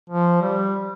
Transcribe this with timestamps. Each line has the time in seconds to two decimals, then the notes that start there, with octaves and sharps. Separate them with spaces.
0.10 F3
0.42 G3